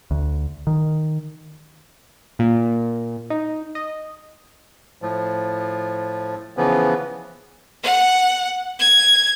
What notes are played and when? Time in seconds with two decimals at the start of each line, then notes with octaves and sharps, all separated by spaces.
0.11 D2
0.67 D#3
2.39 A#2
3.30 D#4
3.75 D#5
5.02 A2 F3
6.57 C#3 E3 F3 B3
7.83 F#5
8.79 G#6